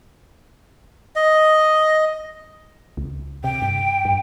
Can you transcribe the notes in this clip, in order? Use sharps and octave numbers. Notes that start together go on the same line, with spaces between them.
D#5
C#2
C3 G5
G2
G2